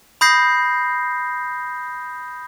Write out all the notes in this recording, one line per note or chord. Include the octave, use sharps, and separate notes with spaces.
B5 D#6 G6 A#6 C7